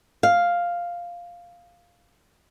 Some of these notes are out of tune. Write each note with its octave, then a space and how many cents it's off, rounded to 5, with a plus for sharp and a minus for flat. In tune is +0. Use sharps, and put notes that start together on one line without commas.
F5 +0